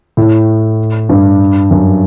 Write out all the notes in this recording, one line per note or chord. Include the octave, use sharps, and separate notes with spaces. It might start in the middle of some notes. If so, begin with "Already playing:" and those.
A2
G2
F#2